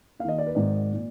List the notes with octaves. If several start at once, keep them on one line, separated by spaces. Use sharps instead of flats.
D#2 F5
D#3 D#5
D5
B4
G#1 G#2 D#3 D5
A#2